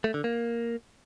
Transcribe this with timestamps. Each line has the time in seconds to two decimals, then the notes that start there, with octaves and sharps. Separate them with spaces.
0.04 A3
0.14 D3
0.24 A#3